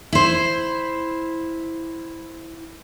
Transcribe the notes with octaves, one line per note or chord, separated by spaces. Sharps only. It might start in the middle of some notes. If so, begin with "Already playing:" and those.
E4 C5